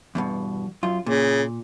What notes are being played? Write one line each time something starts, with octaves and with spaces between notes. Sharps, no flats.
E2 G2 B2
F#2 F4
A#2 C#3